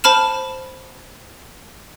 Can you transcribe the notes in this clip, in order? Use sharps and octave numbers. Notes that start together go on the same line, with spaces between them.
C5 A5 B5 F6 E7